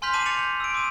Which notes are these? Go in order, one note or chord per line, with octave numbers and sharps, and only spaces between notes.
G#5 C6 F6 G6 B6 F7
A5 D6 G6 C7 D#7 F#7
D6 A6 C#7 F7
G6
E6 D7
C6 D6 D#6 D#7